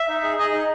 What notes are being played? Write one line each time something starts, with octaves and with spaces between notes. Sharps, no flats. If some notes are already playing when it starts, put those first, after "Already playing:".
Already playing: E5
D#4
G#4
G#4 D#5
D#4